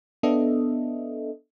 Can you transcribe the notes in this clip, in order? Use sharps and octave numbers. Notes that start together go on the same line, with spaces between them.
B3 D4 A4 D#5 E5